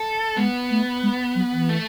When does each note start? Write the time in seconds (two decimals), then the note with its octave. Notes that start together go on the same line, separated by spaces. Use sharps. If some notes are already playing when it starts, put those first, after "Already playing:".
Already playing: A4
0.37 G#3 B3
0.70 A3
1.03 G#3
1.35 F#3
1.52 E3
1.69 A3